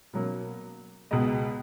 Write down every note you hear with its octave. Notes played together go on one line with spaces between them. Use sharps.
B2 F#3 A#3 C#4
C#2 B2 G#3 B3 D#5